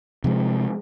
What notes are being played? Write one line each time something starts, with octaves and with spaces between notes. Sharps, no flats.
C3 F3 G#3